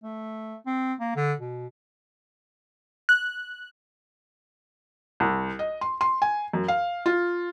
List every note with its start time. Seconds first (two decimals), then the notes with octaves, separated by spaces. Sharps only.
0.04 A3
0.66 C4
1.00 A#3
1.16 D3
1.39 B2
3.09 F#6
5.20 C2
5.59 D#5
5.81 C6
6.01 C6
6.22 G#5
6.53 F#2
6.68 F5
7.06 F4